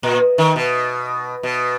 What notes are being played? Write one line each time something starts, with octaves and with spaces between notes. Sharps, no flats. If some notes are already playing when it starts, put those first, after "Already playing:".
A#2
D#3
B2
B2